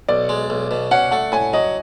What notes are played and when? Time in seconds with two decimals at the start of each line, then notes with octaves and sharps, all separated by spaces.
0.08 B1 D5
0.29 G#3
0.50 B1
0.71 B2
0.91 C#4 F#5
1.11 A3 F#5
1.32 A2 G#5
1.53 F#3 D#5